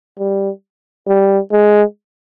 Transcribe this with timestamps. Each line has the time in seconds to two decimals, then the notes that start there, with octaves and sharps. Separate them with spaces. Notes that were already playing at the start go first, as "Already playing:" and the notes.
0.19 G3
1.08 G3
1.52 G#3